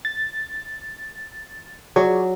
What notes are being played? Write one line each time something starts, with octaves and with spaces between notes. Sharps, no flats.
A6
F#3 G#4 C#5 D5